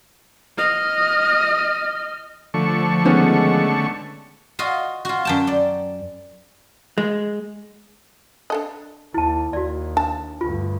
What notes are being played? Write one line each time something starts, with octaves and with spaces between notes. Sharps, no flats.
D#5 F6
D3 F3 A3 C#6
D#3 G#3 B3 C#4
F4 F#4 D#5
F4 F#4
F#2 G5 A5
D5
G#3
D4 A4 D#5
D#2 E4 A5
D#2 F#4 D5
D4 A5
D2 G2 F4